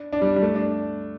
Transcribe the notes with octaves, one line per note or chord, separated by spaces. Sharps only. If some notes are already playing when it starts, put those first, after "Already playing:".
Already playing: D4
D4
G3
G3
A3
D4